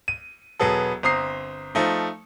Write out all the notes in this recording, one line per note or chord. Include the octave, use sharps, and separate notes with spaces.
D#7
E1 F#3 B3 G#4 A4
G1 C4 A#5 D#6 C7
F3 A3 D#4